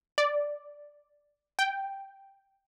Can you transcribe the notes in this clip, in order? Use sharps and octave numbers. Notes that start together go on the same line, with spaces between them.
D5
G5